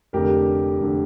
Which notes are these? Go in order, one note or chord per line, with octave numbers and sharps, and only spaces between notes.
F1 F2 D3 G4 A#4
F1 D3